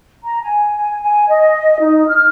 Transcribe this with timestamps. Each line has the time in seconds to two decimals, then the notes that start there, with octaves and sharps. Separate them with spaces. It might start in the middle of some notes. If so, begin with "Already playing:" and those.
0.23 A#5
0.42 G#5
1.02 G#5
1.29 D#5
1.81 D#4
2.08 F6